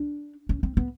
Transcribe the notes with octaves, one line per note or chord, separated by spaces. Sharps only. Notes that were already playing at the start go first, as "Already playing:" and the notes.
Already playing: D4
C#4
C4
B3